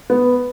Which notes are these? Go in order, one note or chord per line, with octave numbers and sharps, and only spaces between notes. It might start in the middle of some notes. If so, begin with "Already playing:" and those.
B3